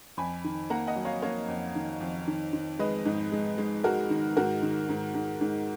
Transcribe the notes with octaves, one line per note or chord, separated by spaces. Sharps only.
F2 G#5 B5
D#3
A#3 F#5 A#5
D#5 F#5
F#3
C#5 F5
A#3 C#5 F5
F2
D#3
F2
D#3
D#3
G#3 B4 D#5
G#2
G#3
G#3
G#3 F#4 A#4
D#3
G#2 F#4 A#4
D#3
G#2
G#2
G#2